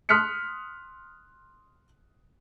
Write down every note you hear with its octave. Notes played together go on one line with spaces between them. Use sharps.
C6 D#6 F6 F#6 B6 C#7